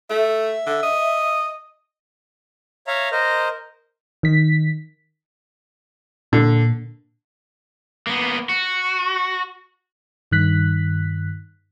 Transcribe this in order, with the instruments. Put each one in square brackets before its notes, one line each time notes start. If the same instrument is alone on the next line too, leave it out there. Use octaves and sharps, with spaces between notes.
[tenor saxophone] A3 [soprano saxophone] E5
[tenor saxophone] D3
D#5
[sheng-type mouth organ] C#5 E5 F5 A#5
A#4 C5 D#5
[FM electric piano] D#3 B6
[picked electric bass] A#2 [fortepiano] D3
[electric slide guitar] A#3 B3
F#4
[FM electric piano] G2 D#3 F#6 B6